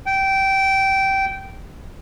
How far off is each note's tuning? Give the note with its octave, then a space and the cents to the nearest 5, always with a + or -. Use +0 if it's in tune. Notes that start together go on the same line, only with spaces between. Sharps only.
G5 -15